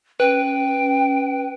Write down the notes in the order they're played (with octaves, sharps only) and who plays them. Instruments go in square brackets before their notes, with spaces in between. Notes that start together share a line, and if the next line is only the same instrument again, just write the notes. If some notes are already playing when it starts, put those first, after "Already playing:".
[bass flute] C#4 [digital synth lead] B4 [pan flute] G5